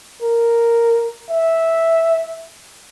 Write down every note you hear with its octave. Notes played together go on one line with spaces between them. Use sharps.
A#4
E5